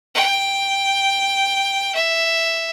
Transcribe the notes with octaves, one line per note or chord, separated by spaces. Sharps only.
G5
E5